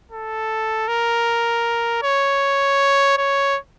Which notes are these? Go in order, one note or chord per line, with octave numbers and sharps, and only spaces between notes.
A4
A#4
C#5
C#5